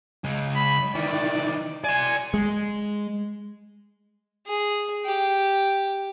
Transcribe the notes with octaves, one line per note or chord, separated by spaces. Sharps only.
C#3 G#3
B5
D#3 E3 D5
D5 G#5 C6
G#3
G#4
G4